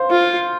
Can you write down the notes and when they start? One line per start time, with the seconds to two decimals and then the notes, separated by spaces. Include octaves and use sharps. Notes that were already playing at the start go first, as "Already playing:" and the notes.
Already playing: C5 F5
0.11 F4